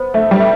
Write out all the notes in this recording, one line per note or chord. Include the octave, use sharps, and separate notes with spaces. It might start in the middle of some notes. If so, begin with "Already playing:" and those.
Already playing: B3 C5
A3 E5
G3
E5